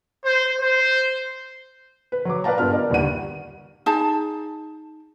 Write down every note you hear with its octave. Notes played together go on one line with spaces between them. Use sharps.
C5
C5
B4
F#3 D6
A#4 B4 D5 F5 A5 A#5
G2 B3 F4 F6
A#4 D5 D#5
G1 D#2 G3 D5 F#5 D#7
D#4 G#4 A5